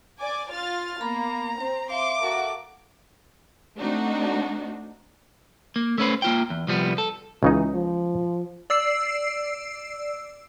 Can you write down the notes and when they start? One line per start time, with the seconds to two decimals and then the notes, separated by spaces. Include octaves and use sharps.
0.19 D5 G#5 D6
0.50 F4 F6 A6
1.01 A#3 B3 A#5 B5
1.60 C4 C5
1.90 E5 F5 C6 D6
2.20 F#4 A4 A#4
3.79 A3 C4 D4 D#4 F#4
5.76 A#3
5.98 A3 C#4 B4 C5
6.22 A#3 F4 G5
6.50 E2
6.67 C2 F3 G3 B3
6.98 A4
7.43 C#2 C#3 E3 D#4
7.74 F3
8.70 D5 E6 C7